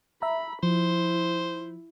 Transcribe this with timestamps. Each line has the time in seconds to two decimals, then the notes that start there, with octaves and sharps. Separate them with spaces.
0.22 E5 A#5 B5
0.63 F3 E4 C5